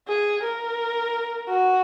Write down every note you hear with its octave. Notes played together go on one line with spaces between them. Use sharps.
G#4
A#4
F#4